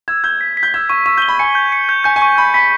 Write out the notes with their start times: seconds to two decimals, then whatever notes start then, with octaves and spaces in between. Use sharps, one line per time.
0.08 E6 G#6
0.24 G6 G#6
0.41 B6
0.57 B6
0.63 G6
0.74 E6 G#6
0.89 C#6 E6
1.06 C#6 E6
1.17 G6 G7
1.28 B5
1.39 G#5 C#7
1.55 G6
1.72 C#7
1.89 G6
2.04 G#5 G6
2.16 G#5
2.22 C#6
2.38 B5 C#6
2.54 B5 B6